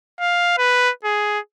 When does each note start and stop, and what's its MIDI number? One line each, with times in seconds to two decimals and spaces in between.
0.20 0.53 77
0.58 0.91 71
1.05 1.39 68